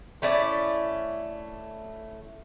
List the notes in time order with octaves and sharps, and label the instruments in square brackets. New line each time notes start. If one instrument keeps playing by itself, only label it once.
[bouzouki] A3 C#4 E4 D5